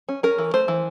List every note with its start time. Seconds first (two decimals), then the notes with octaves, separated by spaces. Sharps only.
0.09 C#4
0.23 C#4 A#4
0.38 E3
0.54 A3 C5
0.68 E3